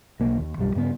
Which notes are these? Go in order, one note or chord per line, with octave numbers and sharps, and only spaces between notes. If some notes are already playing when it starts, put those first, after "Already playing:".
B1 A#3
D#2
B1 F#2 G3
G2 C#3 B3